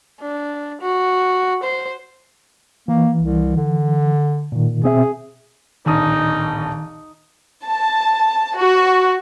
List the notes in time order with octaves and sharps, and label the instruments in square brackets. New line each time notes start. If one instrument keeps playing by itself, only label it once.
[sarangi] D4
F#4
C5
[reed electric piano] E3 [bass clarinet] A#3
[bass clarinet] C2
D3
[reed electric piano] A#2 D#3
[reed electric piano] B2 C4 E5 [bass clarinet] G#4
[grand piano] D1 A#1 D#6 [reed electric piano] D#3 [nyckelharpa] D#4
[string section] A5
F#4